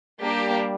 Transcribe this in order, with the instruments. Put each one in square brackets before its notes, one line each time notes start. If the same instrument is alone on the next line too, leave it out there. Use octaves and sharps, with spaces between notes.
[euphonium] G3 [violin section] A#3 D4 G4